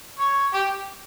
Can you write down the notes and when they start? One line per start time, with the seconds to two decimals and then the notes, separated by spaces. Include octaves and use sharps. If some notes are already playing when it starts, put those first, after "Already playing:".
0.19 C#5
0.54 G4